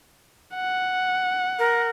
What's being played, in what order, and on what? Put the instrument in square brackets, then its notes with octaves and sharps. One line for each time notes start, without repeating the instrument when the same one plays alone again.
[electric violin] F#5
[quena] A#4